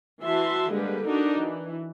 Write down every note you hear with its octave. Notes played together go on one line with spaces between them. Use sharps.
E3 F#4 E5 A5 C6
D3 G3 G#3 A#3 B4
D4 D#4 F#4 A#4
E3